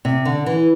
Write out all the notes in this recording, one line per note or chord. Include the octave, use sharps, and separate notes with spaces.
C3
D3
E3